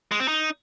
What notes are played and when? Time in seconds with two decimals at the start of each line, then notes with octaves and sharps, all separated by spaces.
0.12 G#3
0.20 C4
0.28 D#4